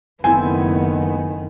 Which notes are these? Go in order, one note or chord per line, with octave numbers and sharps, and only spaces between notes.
F#1 D#3 B3 C4 E4 A4 G#5